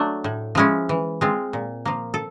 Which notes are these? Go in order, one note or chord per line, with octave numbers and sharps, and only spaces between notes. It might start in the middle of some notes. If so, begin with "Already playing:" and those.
Already playing: F#3 A3 D4
A2
F3 G#3 C#4 E4
E3
G#3 C4 F4
A#2
F3 A#3
A4